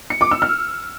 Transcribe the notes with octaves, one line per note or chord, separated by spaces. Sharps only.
C#7
D6
E6
F6